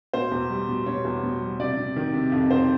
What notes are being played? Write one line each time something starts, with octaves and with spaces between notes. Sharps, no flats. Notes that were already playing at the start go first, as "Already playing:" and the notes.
B2 C5
E2
G3
B2
B2 C#5
E2
B2
G3
C3 D5
C3
D#3
C3
F2
D#3 C5